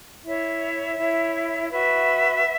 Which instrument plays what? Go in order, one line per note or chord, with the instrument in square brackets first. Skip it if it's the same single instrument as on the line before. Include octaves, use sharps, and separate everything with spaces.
[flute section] E4 C#5 E5
E4 C#5
F#4 B4 E5